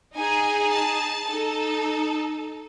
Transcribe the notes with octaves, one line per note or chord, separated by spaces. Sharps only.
D#4 G#4 G#5
A5
D#4 A4